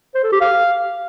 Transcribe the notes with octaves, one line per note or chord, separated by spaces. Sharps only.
C5
A4
G4
F5